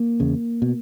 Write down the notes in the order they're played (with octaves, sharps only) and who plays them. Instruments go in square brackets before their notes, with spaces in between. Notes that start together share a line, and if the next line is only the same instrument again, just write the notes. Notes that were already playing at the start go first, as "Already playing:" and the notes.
Already playing: [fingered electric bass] A#3
E2 C#3
B2